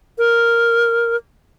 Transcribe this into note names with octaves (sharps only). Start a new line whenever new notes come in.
A#4